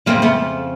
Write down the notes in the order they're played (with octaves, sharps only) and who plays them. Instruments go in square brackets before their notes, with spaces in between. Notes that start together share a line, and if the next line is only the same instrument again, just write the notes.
[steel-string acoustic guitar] F2 C#3 F3 A#3 C4
A3 B3